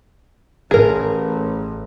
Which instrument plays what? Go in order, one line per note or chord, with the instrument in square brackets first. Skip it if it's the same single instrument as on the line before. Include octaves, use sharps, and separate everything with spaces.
[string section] A1 [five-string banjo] G#4 A#4